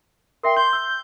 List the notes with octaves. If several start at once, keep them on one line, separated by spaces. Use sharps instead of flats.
A#4 E5 G5 C6
C6 G6
E6